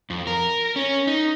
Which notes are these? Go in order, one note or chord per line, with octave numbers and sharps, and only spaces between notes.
F2
A#4
C#4
D#4